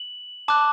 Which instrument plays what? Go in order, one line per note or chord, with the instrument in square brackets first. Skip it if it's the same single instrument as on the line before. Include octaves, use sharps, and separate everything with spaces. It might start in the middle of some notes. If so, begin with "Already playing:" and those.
Already playing: [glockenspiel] F#7
A5 D6 F#6